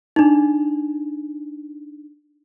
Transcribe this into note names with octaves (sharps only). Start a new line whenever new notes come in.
D4 D#4